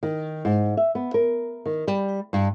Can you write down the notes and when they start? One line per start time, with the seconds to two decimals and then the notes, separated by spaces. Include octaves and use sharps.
0.03 D#3
0.45 G#2
0.77 E5
0.95 B3
1.14 A#4
1.66 D#3
1.88 G3
2.33 G2